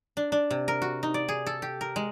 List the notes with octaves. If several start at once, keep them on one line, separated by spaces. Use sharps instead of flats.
D4
D4
C3
A#4
F#4
D#4
D5
G#4
A4
G4
A#4
G#3